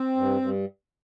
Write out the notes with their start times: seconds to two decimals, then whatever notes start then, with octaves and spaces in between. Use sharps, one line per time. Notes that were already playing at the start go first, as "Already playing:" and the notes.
Already playing: C4
0.16 G2
0.41 G2